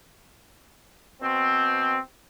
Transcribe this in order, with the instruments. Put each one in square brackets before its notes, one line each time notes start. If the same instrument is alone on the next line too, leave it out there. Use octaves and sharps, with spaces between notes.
[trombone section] B2 C4